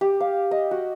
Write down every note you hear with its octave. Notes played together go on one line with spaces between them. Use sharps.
G4
F5
D#5
F#4